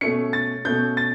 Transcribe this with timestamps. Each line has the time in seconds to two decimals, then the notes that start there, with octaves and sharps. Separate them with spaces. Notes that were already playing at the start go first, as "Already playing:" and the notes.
0.01 B2 A3 C#4 C#7
0.33 A6
0.65 B2 A3 C#4 G6
0.97 A6